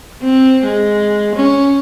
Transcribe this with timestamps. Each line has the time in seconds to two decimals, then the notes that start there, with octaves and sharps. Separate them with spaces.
0.23 C4
0.64 G#3
1.35 C#4